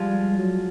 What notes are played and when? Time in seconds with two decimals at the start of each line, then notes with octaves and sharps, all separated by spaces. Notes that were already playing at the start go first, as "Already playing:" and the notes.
Already playing: F3 G3 G#3 F4
0.36 F#3